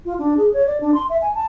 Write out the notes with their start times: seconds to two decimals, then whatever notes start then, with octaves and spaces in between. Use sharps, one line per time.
0.06 F4
0.19 D4
0.37 G#4
0.54 C#5
0.67 D5
0.81 D4
0.94 C6
1.10 E5
1.22 G#5
1.35 A5